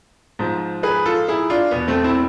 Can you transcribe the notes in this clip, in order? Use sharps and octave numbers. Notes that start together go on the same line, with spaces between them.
G#2 F3
G#4 B4
F4 A4
E4 G#4
D4 F4
E2 B2 B3
A3 C4
C4 E4